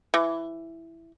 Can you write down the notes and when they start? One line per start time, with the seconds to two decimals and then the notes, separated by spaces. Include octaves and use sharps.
0.14 E3